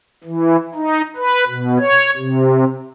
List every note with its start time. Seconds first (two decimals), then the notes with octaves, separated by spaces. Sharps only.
0.24 E3
0.74 D#4
1.16 B4
1.47 B2
1.79 C#5
2.17 C3